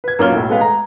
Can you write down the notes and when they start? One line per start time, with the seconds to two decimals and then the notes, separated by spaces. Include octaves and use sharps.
0.04 B4 G#6
0.19 F#2 A#3 F4 C#5 F6 G7
0.32 B1 A2
0.49 G#3 A3 B3 B4 F5
0.61 A#5